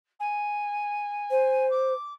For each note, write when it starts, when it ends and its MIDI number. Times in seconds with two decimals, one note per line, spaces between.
0.19 1.68 80
1.31 1.93 72
1.70 2.13 86